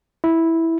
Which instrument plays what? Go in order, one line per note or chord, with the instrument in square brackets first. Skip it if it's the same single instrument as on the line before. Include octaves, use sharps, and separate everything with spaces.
[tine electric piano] E4